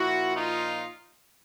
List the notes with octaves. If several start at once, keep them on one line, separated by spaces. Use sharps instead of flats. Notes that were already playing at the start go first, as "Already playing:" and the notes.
Already playing: A#2 F3 E4 F#4
D#4 F4